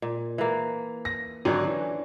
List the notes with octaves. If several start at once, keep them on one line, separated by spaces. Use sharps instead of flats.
A#2
E3 A#3
A#6
G#1 D3 F#3 C#4 D4
E3